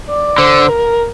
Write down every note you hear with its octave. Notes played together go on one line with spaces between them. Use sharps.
D5
D3 C5
A#4